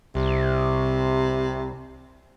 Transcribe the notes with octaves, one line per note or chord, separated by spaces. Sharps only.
C2 C3